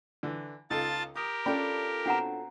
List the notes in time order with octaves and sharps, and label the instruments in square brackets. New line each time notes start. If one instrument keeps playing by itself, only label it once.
[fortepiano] D3 E3
[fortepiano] C#2 D#4 A4 [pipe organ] F4 A5 A6
[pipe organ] G4 A#4 [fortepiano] D#6
[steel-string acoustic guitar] C#4 F4 A4 [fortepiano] D4 G5 [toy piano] B5
[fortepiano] B2 C4 [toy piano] D4 F#5 A#5